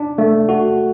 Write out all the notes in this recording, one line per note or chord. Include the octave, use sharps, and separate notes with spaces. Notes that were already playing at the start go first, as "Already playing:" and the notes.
Already playing: D4
A3
F#4